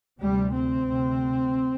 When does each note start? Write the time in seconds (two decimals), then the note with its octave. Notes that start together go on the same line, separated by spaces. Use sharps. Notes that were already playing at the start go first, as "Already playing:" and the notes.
0.20 D2 C3 G3
0.54 C4
0.87 D2 C3